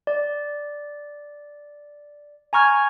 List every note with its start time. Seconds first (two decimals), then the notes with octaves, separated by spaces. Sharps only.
0.07 D5
2.53 G#5 A#5 C#6 F6 G#6